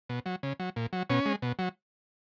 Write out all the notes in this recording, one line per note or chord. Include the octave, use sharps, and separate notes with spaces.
B2
F#3
C#3
F#3
A#2
F#3
B2 C#4
G#3
B2
F#3